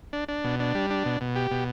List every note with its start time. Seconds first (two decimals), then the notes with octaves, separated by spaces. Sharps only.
0.13 D4
0.28 D4
0.44 B2
0.60 D4
0.75 G3
0.90 D4
1.05 B2
1.21 B2
1.36 G4
1.51 B2